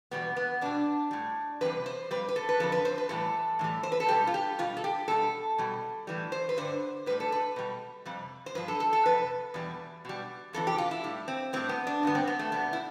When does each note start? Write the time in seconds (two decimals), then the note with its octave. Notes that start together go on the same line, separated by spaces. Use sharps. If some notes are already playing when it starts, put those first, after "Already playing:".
0.11 E2 B2 G3 B3
0.36 B3
0.61 B2 G3 D4
1.11 A2 G3
1.61 E2 C3 G3 B4
1.86 C5
2.11 C3 G3 B4
2.15 F2
2.29 B4
2.36 A4
2.49 B4
2.60 F2 D3 F3 A4
2.72 B4
2.85 C5
2.98 B4
3.09 A2 E3 G3 A4
3.59 A2 E3 G3
3.83 C5
3.92 B4
4.00 A4
4.08 B2 G3 G4
4.27 F4
4.34 G4
4.59 B2 G3 F4
4.77 A4
4.84 G4
5.08 B2 G3 A4
5.58 B2 G3
6.07 A2 E3 G3
6.32 C5
6.49 B4
6.57 G2 D3 G3 C5
7.06 A2 G3 B4
7.20 A4
7.32 B4
7.56 B2 G3
8.05 F2 C3 G3
8.46 C5
8.55 G2 F3 B4
8.68 A4
8.80 A4
8.93 A4
9.06 F2 C3 B4
9.54 E2 B2 G3
10.05 B2 G3
10.53 F2 C3 E3 A4
10.67 G4
10.78 F4
10.91 E4
11.04 A2 G3
11.28 C4
11.53 A2 G3 C4
11.69 B3
11.87 D4
12.03 G2 D3 G3 B3
12.15 C4
12.27 B3
12.39 A3
12.52 B2 G3 B3
12.73 E4